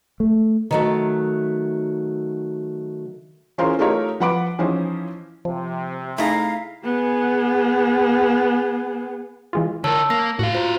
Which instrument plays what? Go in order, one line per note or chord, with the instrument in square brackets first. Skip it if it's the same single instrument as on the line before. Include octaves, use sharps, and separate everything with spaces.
[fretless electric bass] A3
[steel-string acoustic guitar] D#3 F#3 A3
[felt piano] E3 C#4 F4 G#4 A#4 C5
A3 D#4 F4 G4 A#4 C#5
F3 B4 F#5 B5 D6 D7
E3 F3 C#4 D#4 E4 C5
[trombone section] C3 [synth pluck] F3
[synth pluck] A3 D#4 G#4 [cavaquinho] E4 A#5 [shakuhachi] F5
[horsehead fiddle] B3 G#4
[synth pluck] E3 G#3 F4
[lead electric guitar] D3 A#4 [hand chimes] C#5 A5 E6
[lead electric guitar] A#3 [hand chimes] A#6
[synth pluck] A2 [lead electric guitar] F#4 F5
[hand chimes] F4 C5 A#5